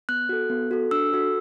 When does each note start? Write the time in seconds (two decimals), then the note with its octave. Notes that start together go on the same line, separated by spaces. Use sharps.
0.09 B3 F#6
0.29 F#4 A4
0.50 B3
0.71 F#4 A4
0.91 D4 E6
1.13 F#4 A4